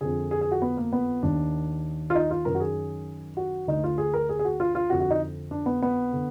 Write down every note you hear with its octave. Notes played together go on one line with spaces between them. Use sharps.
F2 D3 G#4
G#4
G#4
F#4
B3
A#3
B3
D#2 D#3 D4
F4
D#4
F4
F#2 D#3 A#4
F#4
G#4
F#4
D2 D3 D#4
F4
G#4
A#4
G#4
G#4
F#4
F4
F4
F2 D3 F#4
F#4
D#4
D4
B3
B3
D3